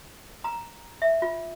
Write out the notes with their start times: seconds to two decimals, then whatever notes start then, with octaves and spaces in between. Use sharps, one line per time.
0.44 A#5
1.02 E5
1.22 F4